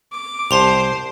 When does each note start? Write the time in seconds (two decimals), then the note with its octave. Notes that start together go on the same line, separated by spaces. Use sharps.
0.12 D6
0.51 C2 C5 A5 C6 F7